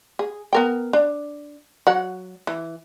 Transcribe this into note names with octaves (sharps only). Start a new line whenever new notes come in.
G#4
B3 A#4 G5
D4
F#3 F#5
E3